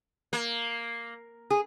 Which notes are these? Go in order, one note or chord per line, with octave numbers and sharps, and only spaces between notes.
A#3
G#4